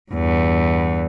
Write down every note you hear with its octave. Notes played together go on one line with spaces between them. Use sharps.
E2 G2